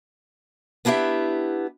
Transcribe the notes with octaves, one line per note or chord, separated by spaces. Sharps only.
B3 D4 E4 G4 E5